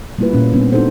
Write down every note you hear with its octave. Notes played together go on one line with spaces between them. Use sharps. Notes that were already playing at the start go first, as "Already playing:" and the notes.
G3 A3 A#3 E4 F4 B4
A#2 C#4
G3 B3 C4 D4
D4 D#4 F#4 A4 C5